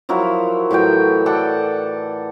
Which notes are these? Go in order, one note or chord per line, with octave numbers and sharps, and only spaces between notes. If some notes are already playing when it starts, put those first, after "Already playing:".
F3 F#3 E4 A#4
A2 E3 F#3 G5
A4 D5 F#5 G5